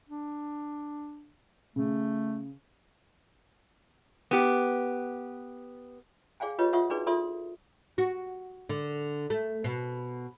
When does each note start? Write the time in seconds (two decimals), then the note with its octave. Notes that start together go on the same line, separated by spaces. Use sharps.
0.09 D4
1.76 C#3 A3
4.31 B3 G4
6.40 G#4 D5 F5 G5 G#5
6.59 F4 G4 B4 C#5 D#5
6.73 F4 E5 F#5 C#6 D#6
6.90 D4 D#4 F#4 G#4 B4 D5
7.07 F4 A4 D5 E5 C6 D#6
7.98 F#4
8.69 D3
9.30 A3
9.64 B2